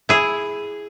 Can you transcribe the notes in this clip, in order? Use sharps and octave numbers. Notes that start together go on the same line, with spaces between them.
E4 G#4